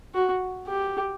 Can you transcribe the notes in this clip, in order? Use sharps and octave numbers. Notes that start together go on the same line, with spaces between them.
F#4
G4